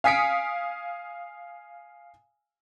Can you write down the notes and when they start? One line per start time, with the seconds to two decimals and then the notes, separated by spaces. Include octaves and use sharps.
0.04 F5 G#5 D#6 B6 C#7 D7